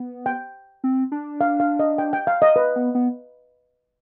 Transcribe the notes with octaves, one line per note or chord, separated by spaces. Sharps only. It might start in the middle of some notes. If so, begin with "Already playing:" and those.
Already playing: B3
G5
C4
D4
F5
F5
D#5
G5
G5
F5
D#5
B4
B3
B3